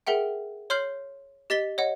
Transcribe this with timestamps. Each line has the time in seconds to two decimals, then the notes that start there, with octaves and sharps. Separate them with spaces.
0.07 G#4 A#4 E5 F#5 G5
0.70 C#5 C6 F6 G6 C7 F#7
1.50 G4 D#5 A6 B6 G7
1.78 C#5 D#5 F#5